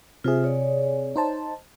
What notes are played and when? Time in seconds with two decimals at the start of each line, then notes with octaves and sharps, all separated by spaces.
0.24 C3 F4 G#4 C5 E5
0.44 C#5 D5
1.16 D#4 C5 A5